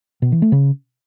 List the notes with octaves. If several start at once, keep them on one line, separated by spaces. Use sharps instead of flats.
B2
E3
A3
C#3